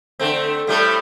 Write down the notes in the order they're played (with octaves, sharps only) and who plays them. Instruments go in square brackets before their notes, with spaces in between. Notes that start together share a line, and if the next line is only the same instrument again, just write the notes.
[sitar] D3 A3 C4
A2 G3 A3